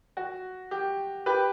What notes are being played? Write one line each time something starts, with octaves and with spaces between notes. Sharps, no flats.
F#4
G4
G4 B4